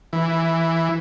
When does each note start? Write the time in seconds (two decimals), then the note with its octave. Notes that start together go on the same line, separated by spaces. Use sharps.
0.13 E3